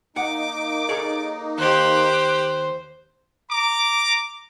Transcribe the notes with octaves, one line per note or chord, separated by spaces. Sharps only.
A#3 D#4 F#5 D6
G#4 A4 C#5
D#2 G4 C5 F#6
A#5 D6